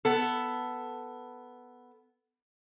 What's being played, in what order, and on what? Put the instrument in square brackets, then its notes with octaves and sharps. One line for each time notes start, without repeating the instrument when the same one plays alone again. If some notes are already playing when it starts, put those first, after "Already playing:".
[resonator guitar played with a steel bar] B3 A4